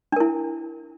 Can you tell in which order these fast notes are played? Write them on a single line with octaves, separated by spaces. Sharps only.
D4 A#4 E4